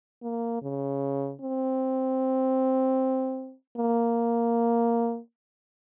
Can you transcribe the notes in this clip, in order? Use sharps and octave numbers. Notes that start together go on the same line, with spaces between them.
A#3
C#3
C4
A#3